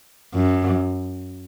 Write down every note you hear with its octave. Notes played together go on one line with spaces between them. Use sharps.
F#2